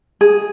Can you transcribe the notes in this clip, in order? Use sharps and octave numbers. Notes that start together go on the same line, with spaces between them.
G#4